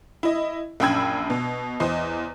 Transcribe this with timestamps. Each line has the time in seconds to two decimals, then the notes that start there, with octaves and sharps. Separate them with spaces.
0.23 E4 D#5
0.80 A#1 F#2 G5 B5 E6 G#6
1.30 B2
1.80 E2 C5 D#5